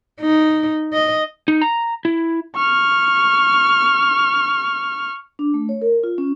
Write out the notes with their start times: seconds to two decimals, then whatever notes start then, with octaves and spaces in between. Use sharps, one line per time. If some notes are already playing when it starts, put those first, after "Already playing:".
0.21 D#4
0.93 D#5
1.48 D#4
1.62 A#5
2.05 E4
2.56 C#6 F6
5.39 D4
5.54 A3
5.69 C#5
5.82 A#4
6.04 F4
6.18 C#4